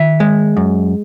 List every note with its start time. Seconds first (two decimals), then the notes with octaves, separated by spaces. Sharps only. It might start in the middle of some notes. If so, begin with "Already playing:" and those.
Already playing: D#3 E5
0.20 G#3
0.57 F#2